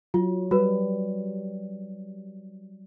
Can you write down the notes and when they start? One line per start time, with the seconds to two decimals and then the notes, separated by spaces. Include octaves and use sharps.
0.14 F#3 F4
0.51 G3 F#4 B4